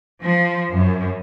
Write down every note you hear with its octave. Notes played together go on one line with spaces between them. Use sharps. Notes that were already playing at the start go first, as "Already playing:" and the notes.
F3
F#2